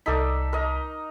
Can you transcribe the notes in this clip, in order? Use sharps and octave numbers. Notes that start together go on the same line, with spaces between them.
C2 D#4 A4 D5 B6
A#4 D#5